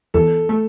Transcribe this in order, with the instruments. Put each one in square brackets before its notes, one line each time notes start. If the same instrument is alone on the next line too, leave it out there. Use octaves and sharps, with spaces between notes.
[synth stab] E2 [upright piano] A4
[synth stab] A3